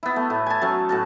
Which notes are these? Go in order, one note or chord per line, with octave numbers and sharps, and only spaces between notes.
B3 E4
A3
A2
G#5 A5
F#3 A3 C#4
A2 F#4 A5